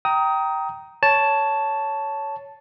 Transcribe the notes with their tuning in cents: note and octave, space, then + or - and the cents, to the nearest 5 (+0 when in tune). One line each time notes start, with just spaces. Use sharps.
G5 -10 A#5 +0 D#6 +20
C#5 +10 A5 +0